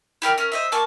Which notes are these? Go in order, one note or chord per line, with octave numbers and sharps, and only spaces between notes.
E4 G4 A#4 D5
C#4 A#4
C5 D#5 E5
A#3 A5 C#6